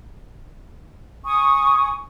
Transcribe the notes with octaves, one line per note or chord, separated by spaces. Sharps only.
G#5 C#6 D#6